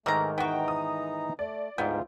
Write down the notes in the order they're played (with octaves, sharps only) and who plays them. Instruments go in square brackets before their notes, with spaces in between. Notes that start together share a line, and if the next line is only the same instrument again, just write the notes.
[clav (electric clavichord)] G#2 D#3 A#4 [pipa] E3 A#5 [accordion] A3
[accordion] E3 D#4 A#5 [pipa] B3 F#4 [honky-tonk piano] G5
[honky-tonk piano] D#6
[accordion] A3 [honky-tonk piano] D5
[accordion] D2 F4 [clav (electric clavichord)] G#2 G5 [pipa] B3